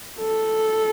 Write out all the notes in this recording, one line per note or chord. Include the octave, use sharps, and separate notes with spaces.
A4